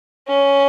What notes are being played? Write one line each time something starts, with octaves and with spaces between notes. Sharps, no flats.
C#4